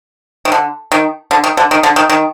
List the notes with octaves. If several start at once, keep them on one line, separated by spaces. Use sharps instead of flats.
D#3
D3
D#3
D3
D#3
D3
D#3
D3
D#3
D#3